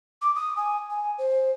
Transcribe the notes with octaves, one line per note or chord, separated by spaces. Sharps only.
D6
D#6
G#5
G#5
C5